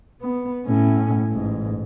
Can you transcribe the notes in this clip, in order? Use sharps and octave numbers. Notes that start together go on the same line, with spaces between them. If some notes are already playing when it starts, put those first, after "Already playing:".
B3
A2 C#4
A1 G#2